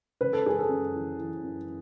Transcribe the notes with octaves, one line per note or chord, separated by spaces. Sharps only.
C#3 B4
A4
F#2 G#4
A4
F#2
E3
E3
F#2